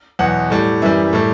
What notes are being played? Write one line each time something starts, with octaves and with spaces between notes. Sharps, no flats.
E2 B2 F#3 F#5
A2 G3
F#2 E3 G3 E5
A2 G3